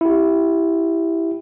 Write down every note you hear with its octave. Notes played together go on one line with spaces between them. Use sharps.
E4 G4